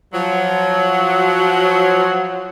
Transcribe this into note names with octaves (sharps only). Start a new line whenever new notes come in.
F3 F#3